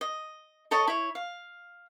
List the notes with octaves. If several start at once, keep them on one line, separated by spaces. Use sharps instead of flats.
D#5
A4 C#5 D#5 A5
E4 C#5
F5